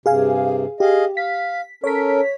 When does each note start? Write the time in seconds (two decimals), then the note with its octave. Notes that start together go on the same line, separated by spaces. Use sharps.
0.06 G2 C3 G#4 F5 G#5
0.80 G4 G#4 D#5 F5
1.17 F5 B6
1.84 C#4 A4 A#4 C#5 B6